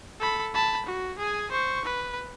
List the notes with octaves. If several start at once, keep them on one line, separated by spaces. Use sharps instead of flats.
A4 B5
A5 B5
F#4
G#4 G#5
C5 C#6
B4